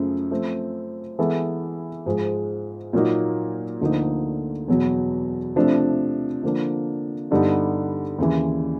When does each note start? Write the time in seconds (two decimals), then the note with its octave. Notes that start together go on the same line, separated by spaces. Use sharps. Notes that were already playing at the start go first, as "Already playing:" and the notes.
Already playing: F#2 C#3 F3 A3
0.31 F3 A3 C4
1.19 E3 G#3 B3 E4 A4
2.06 G#2 F3 G#3
2.93 A#2 F#3 A#3 D#4
3.81 D2 D3 F3 A#3 D#4
4.68 E2 B2 F#3
5.56 C3 F3 A3 D4
6.43 D3 F3 A#3 D4
7.31 G2 D3 G3 B3 D#4
8.18 D#2 C#3 E3